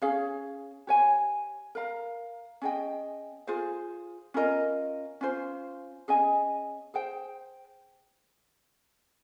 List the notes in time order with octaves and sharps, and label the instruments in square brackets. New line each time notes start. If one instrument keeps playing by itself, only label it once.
[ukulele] C#4 G#4 C#5 F5
G4 C#5 G#5
A#4 F5 A#5
C#4 G#4 D#5 G5
F4 G#4 C5
C#4 F4 A#4 D#5
C#4 F4 C5
C#4 G#4 D#5 G#5
G#4 C5 G5